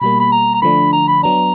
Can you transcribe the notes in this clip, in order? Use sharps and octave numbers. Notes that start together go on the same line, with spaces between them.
B2 G3 A#3 B5
B5
A#5
A#5
D3 F3 A3 D4 B5
A#5
B5
F#3 B3 D4 A#5